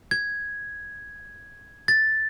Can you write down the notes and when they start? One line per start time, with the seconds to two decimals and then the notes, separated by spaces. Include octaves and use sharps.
0.11 G#6
1.88 A6